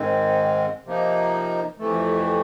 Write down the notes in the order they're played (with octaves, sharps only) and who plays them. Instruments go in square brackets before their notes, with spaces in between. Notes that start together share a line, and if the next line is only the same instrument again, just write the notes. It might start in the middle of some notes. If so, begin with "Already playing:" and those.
Already playing: [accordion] G#2 D#3 G#3 C4
C3 F3 A#3 D#4
F2 C3 E3 A3